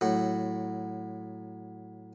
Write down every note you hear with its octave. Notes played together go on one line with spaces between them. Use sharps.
A2 F#3